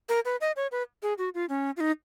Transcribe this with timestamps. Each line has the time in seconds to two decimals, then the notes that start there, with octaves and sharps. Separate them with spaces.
0.09 A#4
0.25 B4
0.41 D#5
0.56 C#5
0.72 B4
1.03 G#4
1.18 F#4
1.35 F4
1.49 C#4
1.77 F4
1.80 D#4